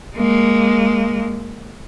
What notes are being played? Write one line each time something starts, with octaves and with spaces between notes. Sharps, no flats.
G#3 A#3